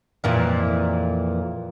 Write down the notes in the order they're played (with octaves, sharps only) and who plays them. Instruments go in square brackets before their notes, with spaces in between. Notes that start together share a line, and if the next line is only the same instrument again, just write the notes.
[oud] F2 A#2 E3